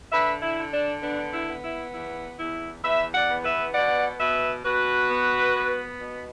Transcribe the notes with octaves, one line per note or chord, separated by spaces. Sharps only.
D3 B4 E5
E4
D3
D4
B3 D4
E4
B3
E4
E2 E4
E2 E4
E2 B4 E5
D5 F#5
B3
B4 E5
B2 D5 F#5
B2 B4 E5
B2 F#4 B4
B3
B3
B2